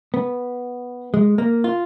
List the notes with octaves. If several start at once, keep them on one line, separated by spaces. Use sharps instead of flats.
B3
G#3
A#3
F4